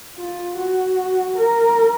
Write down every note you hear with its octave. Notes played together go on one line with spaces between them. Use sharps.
F4
F#4
A#4